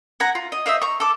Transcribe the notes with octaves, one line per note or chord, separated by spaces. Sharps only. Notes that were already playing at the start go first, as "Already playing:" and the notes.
F#5 G#5 A#5
F4
D#5
F4 C5 D#5 E5
A#5 C#6
A4 D6